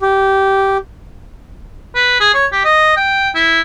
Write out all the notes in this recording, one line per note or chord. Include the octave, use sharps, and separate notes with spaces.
G4
B4
G#4
C#5
G4
D#5
G5
E4